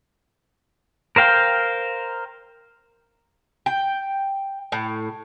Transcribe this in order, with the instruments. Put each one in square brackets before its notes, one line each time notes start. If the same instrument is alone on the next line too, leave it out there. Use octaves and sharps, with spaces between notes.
[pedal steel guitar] A#4 C5 F5 G5
[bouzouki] G5
A2